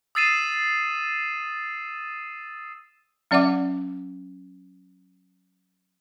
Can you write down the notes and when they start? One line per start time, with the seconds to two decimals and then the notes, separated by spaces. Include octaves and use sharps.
0.15 D#6 E6 A6 C7 D#7 E7
3.31 F#3 C#4 D5 E5 F#5 D6